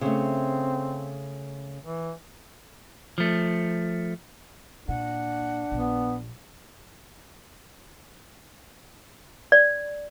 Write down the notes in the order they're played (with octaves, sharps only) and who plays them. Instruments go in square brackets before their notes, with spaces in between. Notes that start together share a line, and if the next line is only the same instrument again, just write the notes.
[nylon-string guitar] C#3 A3 [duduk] C4
[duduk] E3
[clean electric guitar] F3 A3
[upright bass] A#2 [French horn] D4 [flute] F#5
[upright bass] A#1 [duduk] B3
[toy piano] D5